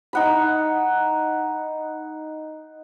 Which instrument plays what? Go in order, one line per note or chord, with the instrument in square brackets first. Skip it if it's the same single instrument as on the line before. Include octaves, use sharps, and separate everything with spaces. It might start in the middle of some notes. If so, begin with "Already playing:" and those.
[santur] D#4 F#5 B5